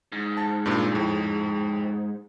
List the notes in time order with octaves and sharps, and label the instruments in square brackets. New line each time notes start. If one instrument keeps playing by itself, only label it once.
[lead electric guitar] G#2
[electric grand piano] A5
G2 A#2
F2 A2